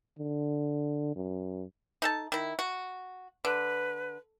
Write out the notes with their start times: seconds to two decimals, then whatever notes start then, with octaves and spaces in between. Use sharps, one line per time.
0.18 D3
1.16 F#2
2.02 D#4 A4 A5
2.32 D#3 E4
2.59 F#4
3.45 D3 B4